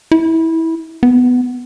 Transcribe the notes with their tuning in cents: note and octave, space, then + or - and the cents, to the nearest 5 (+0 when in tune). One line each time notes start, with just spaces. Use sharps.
E4 -20
B3 +10